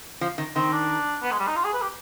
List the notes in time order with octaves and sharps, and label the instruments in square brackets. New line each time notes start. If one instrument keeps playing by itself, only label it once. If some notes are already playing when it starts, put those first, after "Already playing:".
[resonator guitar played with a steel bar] F3
D#3
[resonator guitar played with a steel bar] D#3 [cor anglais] C4
[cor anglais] D4
B3
G#3
G3
D#4
F4
G#4
B4
G4